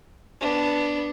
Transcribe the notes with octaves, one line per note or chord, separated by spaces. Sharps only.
B3 D4